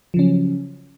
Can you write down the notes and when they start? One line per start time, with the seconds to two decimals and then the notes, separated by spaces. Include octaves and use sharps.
0.14 F3
0.16 C#3
0.19 C#4
0.22 F#3